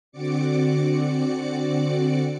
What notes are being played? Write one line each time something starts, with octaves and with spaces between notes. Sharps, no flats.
D3 C4 F#4 D5 D6 C#7